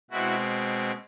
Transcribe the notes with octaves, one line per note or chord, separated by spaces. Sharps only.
B2 G#3 C4 E4 F#4